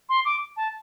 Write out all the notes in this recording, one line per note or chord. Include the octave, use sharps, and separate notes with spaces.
C6
D6
A5